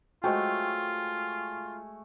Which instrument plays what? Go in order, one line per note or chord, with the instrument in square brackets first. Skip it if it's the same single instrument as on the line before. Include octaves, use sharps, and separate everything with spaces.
[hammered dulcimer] G#3 A3 C#5 [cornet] F4 [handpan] F#4 C5 D#5 [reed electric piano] G5